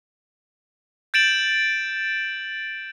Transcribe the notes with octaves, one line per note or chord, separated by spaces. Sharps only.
G6 A6 D7 E7 F#7